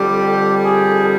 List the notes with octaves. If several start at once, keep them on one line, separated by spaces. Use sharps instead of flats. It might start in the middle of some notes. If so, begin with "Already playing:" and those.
Already playing: F2 D3 G3 G4
G#4